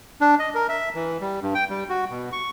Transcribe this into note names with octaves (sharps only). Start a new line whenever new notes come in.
D4
D#5
A#4
E5
E3
G3
G2
G5
G3
F#4
B2
C#6